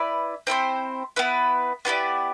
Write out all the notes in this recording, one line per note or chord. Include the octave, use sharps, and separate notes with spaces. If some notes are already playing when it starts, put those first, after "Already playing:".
Already playing: E4 B4 D5
C4 E4 A4 C5
B3 E4 B4
B3 E4 G4 D5